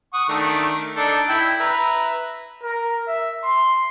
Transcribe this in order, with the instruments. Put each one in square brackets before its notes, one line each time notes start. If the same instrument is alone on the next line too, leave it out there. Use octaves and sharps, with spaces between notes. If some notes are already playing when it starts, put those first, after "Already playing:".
[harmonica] F#5 C#6 D#6
D#3 A3 D4
D4 D#4 A4
E4 E5 G5
B4 E5 A#5
[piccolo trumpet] A#4
E5
C6